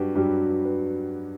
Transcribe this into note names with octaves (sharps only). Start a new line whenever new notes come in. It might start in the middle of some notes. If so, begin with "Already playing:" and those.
Already playing: G2 F#3 F#4 G4 B4
G2 F#3 G4
B4